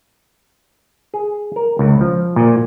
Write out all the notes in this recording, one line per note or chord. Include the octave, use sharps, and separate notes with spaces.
G#4
A#4
C#2
F3
A#2